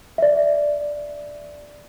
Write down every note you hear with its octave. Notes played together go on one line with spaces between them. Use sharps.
D5 E5